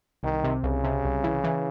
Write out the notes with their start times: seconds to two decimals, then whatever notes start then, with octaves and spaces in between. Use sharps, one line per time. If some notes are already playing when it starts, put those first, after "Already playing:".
0.23 C2 D#3
0.44 C3
0.63 C2 C#3
0.84 C3
1.04 C2
1.24 E3
1.44 E3